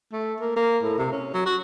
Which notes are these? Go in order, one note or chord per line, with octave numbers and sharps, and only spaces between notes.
A3
A#3
A#3
A2
C3
C#4
F#3
F#4